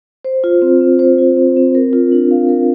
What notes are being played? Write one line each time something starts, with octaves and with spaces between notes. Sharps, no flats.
C5
F4
C4
C4
C5
F4
C4
C4
A#4
F4
D4
F5
A#4